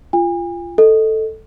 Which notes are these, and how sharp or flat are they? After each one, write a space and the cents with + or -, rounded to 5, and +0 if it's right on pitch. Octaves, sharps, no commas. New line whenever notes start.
F4 -20 G#5 -45
A4 +0 D#5 +0